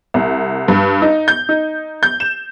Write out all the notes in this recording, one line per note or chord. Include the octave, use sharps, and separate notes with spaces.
C2
G2
D#4
G6
D#4
G6
E7